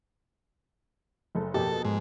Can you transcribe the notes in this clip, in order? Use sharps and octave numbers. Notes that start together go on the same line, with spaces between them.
F#1 A4
F2 B2 A#3 G4 A4
G#2